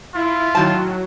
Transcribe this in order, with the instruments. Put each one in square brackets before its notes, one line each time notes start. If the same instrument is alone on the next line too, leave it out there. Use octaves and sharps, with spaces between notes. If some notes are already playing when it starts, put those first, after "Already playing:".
[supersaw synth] E4 [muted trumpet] F4
[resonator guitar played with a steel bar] A2 D#3 A5 [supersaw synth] F#3